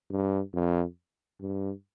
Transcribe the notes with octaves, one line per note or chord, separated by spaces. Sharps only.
G2
F2
G2